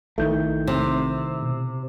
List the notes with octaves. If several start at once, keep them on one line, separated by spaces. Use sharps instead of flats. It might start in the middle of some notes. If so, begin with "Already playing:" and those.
A#1 D#3 E3 A3 D#4 G6
C3
B2